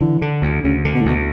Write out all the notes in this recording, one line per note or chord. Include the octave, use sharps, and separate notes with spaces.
D3 E3
D3
D2
D2 C#3
D3
B2
A2
D2 B2